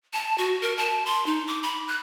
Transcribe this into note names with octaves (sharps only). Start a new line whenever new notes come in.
A5
F#4
A#4
A5
C6
D#4
D6
B5
F#6